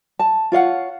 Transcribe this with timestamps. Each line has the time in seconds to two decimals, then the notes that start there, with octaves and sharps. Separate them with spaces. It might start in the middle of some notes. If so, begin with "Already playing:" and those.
0.19 A5
0.52 F4 C#5 F5 F#5